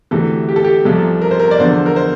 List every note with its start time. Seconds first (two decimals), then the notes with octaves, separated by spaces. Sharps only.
0.11 D2 C3 E3 A4
0.49 G4
0.56 A4
0.64 G4
0.85 C2 C3 F3 A4
1.21 A#4
1.31 C5
1.40 A#4
1.51 D5
1.58 E2 D3 F3 C5
1.86 A#4
1.96 C5